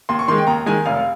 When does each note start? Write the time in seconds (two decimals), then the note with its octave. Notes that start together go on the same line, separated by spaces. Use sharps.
0.09 D#2 C6
0.19 C#6
0.28 D#3 G#3 C6
0.38 G5
0.47 D#2 A#5
0.66 D#3 G#3 G#5
0.85 F1 F5